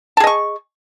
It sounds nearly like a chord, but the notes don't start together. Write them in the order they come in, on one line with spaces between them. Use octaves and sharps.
A5 G#4 D#5 C#6